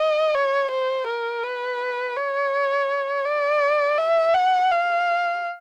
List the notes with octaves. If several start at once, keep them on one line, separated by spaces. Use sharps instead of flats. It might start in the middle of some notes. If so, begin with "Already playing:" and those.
Already playing: D#5
C#5
C5
A#4
B4
C#5
D5
E5
F#5
F5